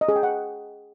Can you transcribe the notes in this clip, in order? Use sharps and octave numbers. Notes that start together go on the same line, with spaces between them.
D#5
G#4
G5
F#5